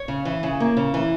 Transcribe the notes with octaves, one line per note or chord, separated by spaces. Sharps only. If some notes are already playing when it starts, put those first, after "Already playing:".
Already playing: C#5
C#3
E3
C#3
A#3
C#3
E3